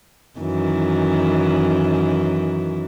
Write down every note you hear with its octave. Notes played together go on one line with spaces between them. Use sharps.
F#2 D#3 E3